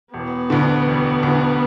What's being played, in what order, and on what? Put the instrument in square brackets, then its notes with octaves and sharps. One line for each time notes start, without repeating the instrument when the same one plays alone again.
[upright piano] E1 [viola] B3
[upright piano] D2 D3
E1
D2
D3